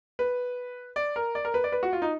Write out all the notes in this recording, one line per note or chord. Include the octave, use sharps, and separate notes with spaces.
B4
D5
A#4
D5
A#4
B4
D5
B4
F#4
F4
D#4